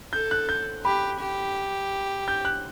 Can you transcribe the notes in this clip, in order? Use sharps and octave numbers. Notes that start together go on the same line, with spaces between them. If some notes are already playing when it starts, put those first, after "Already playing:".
A4 G6
F#6
G6
G4 B5
G4
G6
F#6